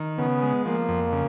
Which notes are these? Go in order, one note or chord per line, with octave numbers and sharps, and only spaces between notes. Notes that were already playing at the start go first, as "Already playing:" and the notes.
Already playing: D#3
C#3 B3
G#3
F3 A#3
F2
C#3